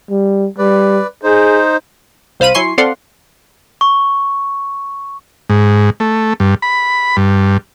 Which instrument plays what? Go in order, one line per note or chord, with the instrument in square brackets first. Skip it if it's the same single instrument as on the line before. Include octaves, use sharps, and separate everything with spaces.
[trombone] G3
[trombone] G3 [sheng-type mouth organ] B4 D5
[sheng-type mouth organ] D#4 C5 [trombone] G#4
[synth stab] C2 C5 F5 B5 D#7
F#3 E4 G#5 C6 C#6 C7
C4 A4 D5 F5 F#5 C6
[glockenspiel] C#6
[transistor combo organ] G#2
A3
G2
B5
G2